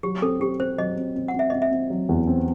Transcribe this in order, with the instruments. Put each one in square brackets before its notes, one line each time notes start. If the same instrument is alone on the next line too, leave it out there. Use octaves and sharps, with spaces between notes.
[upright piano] F#3 [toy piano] G4
[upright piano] C4 [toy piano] A4
[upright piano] C4 [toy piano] G4
[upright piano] C4 [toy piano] C5
[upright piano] F#3 [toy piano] D#5
[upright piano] C4
C4
[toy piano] F#5
[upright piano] C4
[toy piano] E5
[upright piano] C4 [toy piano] D#5
[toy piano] E5
[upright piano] C4
F#3
E2
C4